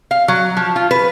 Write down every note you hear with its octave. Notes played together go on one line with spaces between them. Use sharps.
F5
F#3
F3
F4
B4